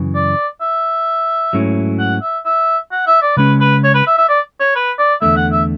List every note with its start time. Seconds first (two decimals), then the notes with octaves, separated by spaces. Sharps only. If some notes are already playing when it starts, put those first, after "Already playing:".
Already playing: F#2 C#3 E3
0.15 D5
0.61 E5
1.53 G#2 F#3 A3 C#4 E4
1.99 F#5
2.22 E5
2.45 E5
2.92 F#5
3.07 E5
3.22 D5
3.37 C#3 G#3 C#4 B4
3.60 B4
3.84 C#5
3.94 B4
4.06 E5
4.17 E5
4.29 D5
4.60 C#5
4.75 B4
4.98 D5
5.21 E2 D3 A3 E5
5.36 F#5
5.52 E5